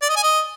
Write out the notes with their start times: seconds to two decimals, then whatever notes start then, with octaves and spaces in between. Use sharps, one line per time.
0.02 D5
0.09 D#5
0.16 G#5
0.23 D#5